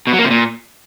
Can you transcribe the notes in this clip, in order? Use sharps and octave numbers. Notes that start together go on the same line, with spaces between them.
B2
F#3
A#3
C3
A#2